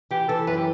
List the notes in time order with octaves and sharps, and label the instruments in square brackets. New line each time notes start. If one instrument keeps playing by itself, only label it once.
[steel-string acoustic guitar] E3 [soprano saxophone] G4
[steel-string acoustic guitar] E3 [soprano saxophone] A4
[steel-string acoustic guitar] F#2 [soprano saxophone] B4
[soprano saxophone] G4